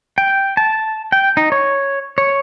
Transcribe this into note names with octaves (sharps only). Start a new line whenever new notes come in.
G5
A5
G5
D#4
C#5
C#5